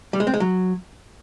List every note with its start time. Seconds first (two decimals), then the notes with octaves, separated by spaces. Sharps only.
0.13 G3
0.20 G#3
0.27 C4
0.34 G#3
0.40 F#3